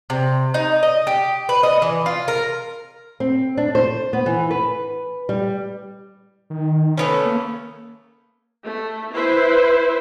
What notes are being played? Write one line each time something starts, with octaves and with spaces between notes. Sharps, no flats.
C3
D#4
D#5
G4
B4
D#5
E3
F4
A#4
C4
D4
C5
B3
E3
B4
G3
D#3
A3 B3 C#4
A#3
A3
E4 B4 C5